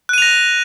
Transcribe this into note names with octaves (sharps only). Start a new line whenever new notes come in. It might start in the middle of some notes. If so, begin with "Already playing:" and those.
F#6 A#6 D#7 F7